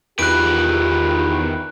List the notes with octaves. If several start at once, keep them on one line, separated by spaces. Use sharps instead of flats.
E2 D#3 F4 G4 B4 F#6 D7